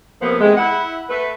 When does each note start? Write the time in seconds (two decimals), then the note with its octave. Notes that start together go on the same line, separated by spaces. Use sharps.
0.22 F2 C3 F3 A#3 B3
0.40 C3 E3 G#3
0.57 E4 F#5
1.10 A3 B4